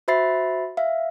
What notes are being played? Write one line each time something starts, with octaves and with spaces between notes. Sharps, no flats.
F#4 C5 E5 B5 A6 C7
E5 F5